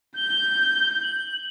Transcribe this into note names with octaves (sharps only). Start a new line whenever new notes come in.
G6 G7
F#7